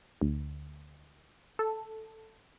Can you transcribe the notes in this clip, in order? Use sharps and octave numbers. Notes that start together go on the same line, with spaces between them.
D2
A4